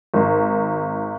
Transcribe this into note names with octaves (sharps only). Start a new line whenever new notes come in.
G#1